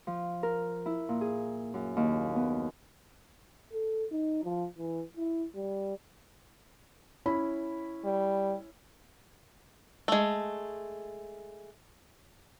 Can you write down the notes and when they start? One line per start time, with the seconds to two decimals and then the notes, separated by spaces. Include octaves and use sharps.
0.07 F3
0.43 A#4
0.86 E4
1.09 A#2
1.21 G#4
1.74 F#2
1.97 D#2
2.36 B3
3.72 A4
4.12 D#4
4.44 F3
4.78 E3
5.17 E4
5.55 G3
7.26 C#4 E4 B5
8.05 G3
10.08 G#3 A3